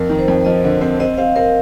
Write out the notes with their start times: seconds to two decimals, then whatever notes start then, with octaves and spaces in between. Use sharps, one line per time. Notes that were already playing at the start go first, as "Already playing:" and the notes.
Already playing: F2 A#4
0.09 D#3
0.19 C5
0.28 F2
0.45 F3 D#5
0.64 D3
0.81 C4
1.00 C4 D#5
1.18 C4 F5
1.36 C4 A#4